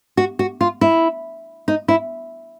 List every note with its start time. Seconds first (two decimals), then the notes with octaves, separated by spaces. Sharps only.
0.17 F#4
0.39 F#4
0.61 F4
0.81 E4
1.68 D#4
1.88 E4